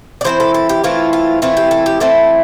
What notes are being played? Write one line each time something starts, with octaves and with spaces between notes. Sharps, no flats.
D5
E3 A3 C4 E4 C5
A4
A4
G4
E3 A3 C4 E4 F4
F4
E3 A3 C4 E4 F4
G4
A4
G4
E3 A3 C4 E4 A4